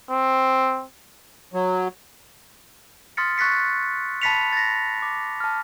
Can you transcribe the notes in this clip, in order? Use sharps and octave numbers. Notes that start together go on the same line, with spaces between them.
C4
F#3
C6 D#6 F6 A6 B6 C#7
C#6 F#6 A6 B6 C#7
A5 B5 A6 B6 C#7 F7
A6 A#6
D6
A5 F6